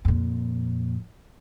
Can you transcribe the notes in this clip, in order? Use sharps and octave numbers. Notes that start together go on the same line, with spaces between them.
F2 A#2